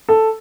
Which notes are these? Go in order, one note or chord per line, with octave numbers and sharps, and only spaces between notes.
A4